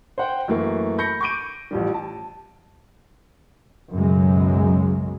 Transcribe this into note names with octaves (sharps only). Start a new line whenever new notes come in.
C5 F#5 G5
F#2 E3 A3 A#3
B5 G6 A#6 C#7
C#6 D6 G6 D7 D#7
A1 F3 G3
A5
B1 F#2 C#3 F#3 G#3